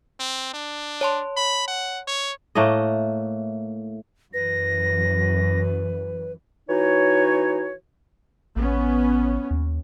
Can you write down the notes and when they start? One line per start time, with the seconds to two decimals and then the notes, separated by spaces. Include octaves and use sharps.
0.20 C4
0.54 D4
1.01 C#5 A5 C6
1.37 B5
1.68 F#5
2.07 C#5
2.55 A2 A3 A#3 D#5
4.34 F#2 E3 B4 A#6
6.69 E3 D#4 F#4 C#5
8.56 A1 B3 C#4
9.51 D#2